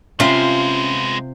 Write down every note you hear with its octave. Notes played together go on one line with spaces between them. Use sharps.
C3 G#3 B3 C#4 F4 C5